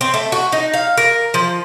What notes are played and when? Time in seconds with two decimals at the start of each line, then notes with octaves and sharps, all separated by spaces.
0.01 C4
0.14 A3
0.32 F#4
0.52 D#4
0.74 F5
0.98 A#4
1.34 F3